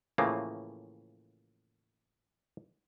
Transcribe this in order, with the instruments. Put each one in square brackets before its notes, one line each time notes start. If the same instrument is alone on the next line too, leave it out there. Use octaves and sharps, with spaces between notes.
[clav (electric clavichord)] A2 C#3 E3 F3 A#3